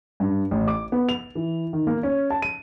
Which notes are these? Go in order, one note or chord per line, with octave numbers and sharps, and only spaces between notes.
G2
A1
D6
B3
F7
E3
D#3
A#3
C#4
A5
D#7